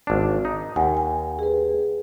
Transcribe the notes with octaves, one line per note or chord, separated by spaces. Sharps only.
G#1 D4
D#4
D#2 F#5 G#5
G#5
G#4 B4